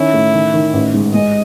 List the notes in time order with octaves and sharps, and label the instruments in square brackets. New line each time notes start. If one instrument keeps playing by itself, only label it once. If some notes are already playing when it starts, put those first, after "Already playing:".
Already playing: [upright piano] D#3 C#4 [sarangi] E4
[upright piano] A2
D#3
D#3
A1
G#2
[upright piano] G#3 [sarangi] D#5